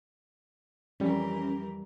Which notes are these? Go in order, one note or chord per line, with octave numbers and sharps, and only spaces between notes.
F2 E3 G3 C#4 G4 A#4